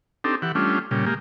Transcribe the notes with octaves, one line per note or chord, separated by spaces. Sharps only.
C4 D4 D#4 G4 A4
E3 G4 F#5
G3 A3 C#4 D4 F4
A#2 C#3 G3
G#3 A#3 G4